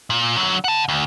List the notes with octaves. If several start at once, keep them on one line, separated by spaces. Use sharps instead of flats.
A#2
D3 F#3
F#5 A5
D2